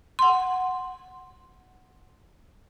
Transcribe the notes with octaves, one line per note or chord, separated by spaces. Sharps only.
F#5 C6